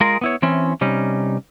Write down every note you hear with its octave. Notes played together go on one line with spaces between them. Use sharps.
G#3 F4 G#4 A#4 D#5
B3 E4 C#5
E3 C4 C#4 E4
C3 G3 C#4 D#4